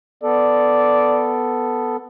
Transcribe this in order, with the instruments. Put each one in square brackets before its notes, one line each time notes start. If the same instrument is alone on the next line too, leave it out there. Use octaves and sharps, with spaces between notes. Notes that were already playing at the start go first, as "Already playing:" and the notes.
[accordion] B3 A4 [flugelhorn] D5